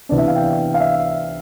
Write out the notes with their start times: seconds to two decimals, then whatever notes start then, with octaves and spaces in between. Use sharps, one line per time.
0.09 C3 E3 B3 D4 D5
0.18 E5
0.28 F5
0.36 G5
0.74 F5
0.80 E5